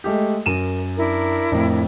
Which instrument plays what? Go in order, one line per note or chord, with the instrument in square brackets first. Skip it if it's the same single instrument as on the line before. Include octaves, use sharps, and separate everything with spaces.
[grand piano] G#3 A3 G4
[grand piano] F#2 D#7 E7 [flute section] A#4
[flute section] D4 E4 A#4
[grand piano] F2 A2